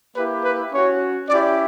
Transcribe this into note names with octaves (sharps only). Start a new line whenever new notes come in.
A#3 E4 G4 B4
B4
C#4 F#4 C#5
C#4 E4 G4 D5